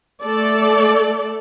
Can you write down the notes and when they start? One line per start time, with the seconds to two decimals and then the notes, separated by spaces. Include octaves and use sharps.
0.23 A3 A4 D5